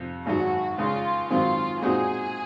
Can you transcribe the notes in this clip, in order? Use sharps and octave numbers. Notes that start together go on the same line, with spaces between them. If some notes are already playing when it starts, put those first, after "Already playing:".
Already playing: F2 C3
G#1 G#2 F#3 F#4
C#2 C#3 G#3 F4
G#2 D#3 F#3 C4 F4
A#2 G#3 C4 D#4 F#4 G#4